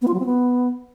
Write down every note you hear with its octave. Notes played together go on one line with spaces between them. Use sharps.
B3
F4
F#3
C4
B3